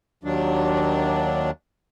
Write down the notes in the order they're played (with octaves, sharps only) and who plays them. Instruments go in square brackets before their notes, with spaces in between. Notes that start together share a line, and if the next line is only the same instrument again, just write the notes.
[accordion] D#2 D#3 F#3 D4